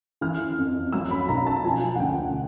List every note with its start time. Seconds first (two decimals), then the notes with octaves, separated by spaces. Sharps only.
0.21 E3 F6
0.58 F2
0.92 F#3 E6
1.11 B5
1.29 B1 A#5
1.46 A5
1.64 F3 G#5
1.95 F#5
2.00 D2 G5